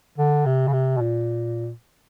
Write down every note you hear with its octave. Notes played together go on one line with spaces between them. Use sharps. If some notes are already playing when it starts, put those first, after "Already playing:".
D3
C3
C#3
C3
B2
A#2